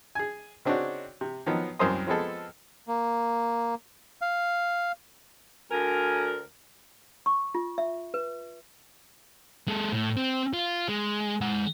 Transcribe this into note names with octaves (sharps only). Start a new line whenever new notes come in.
G#4 G#5
C#3 C4 D4 D#4 F#4 C#5
C3
D#3 F3 F#3 B3
C2 F#2 A#4 C5 C6 D#6
F3 G#3 B3 C4 G#4 A4
A#3
F5
D2 A#4 G#5
C#6
F4
E5
B4
G#3 A4
A2
C4
F4
G#3
G#3 F#5